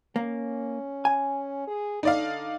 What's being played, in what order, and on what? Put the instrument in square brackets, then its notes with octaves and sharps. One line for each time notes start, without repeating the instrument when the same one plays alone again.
[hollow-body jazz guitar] A#3 [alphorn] C#4
[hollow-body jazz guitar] G#5
[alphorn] G#4
[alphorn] D3 [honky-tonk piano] D#4 D5 F5